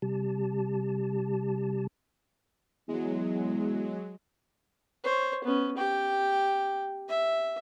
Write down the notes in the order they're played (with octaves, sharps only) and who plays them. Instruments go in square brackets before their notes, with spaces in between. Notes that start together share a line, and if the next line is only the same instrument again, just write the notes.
[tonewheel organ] C3 G3 G4 A5
[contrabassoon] E2 [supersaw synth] F#3 G#3
[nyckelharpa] C5 C#5
B3 C#4
G4 G5
E5